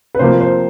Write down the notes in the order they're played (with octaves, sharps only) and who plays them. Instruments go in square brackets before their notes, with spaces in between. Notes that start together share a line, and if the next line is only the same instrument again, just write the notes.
[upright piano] B4
C3 F3 A#3 C5
C5